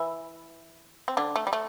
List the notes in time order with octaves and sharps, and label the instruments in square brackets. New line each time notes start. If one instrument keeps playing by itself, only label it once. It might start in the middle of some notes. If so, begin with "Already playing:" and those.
Already playing: [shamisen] E3 E4
C4
D3 D4
A3
G3
A3